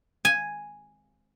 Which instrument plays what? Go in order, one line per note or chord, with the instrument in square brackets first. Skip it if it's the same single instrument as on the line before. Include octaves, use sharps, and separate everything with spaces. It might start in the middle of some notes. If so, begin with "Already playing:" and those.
[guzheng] G#5